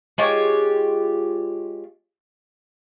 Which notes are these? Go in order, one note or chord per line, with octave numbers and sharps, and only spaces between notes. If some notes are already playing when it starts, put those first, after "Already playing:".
G#3 F4 G4 C#5